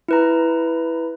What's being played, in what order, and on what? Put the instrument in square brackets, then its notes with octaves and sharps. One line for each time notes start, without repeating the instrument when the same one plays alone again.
[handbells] E4 B4 A#5